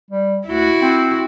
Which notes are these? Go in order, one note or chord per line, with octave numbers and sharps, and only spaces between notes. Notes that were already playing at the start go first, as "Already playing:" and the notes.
G3
D2 E4 F#4
C4